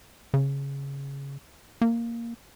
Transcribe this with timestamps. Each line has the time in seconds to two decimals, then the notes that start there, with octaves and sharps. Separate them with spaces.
0.34 C#3
1.81 A#3